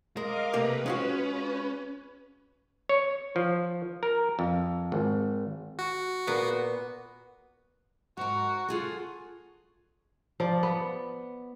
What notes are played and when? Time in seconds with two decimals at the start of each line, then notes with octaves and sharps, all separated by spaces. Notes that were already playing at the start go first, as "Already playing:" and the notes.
0.17 G#3 A#4 D#5 F5 D6
0.53 C3 A3 A#3 B4
0.86 G#3 C#4 F4 F#4
2.89 C#5
3.36 F3
4.03 A#4
4.39 F2
4.92 G#1
5.79 F#4
6.27 A#2 B3
8.17 G#2 F#4 A#4
8.68 F4 G#4 A4
10.40 F3 D5
10.63 B3